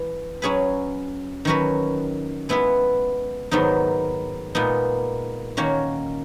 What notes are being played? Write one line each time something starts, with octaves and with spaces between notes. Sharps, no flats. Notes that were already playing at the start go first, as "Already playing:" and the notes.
Already playing: E3
F#3 C#4 G#4 B4
D#3 F#3 C#4 F#4 B4
G#3 B3 E4 B4
G#2 D#3 F#3 B3 D#4
A#2 G#3 B3 D#4
D#3 A#3 C#4 F#4 C#5